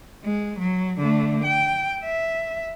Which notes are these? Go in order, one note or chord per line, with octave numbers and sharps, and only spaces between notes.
G#3
F#3
D3 A3
G5
E5